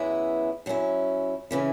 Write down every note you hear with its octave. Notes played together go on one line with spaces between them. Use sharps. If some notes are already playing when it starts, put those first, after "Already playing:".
Already playing: F#2 E3 G#3 B3 E4
F#2 F#3 C#4 E4
C#3 E3 C#4 E4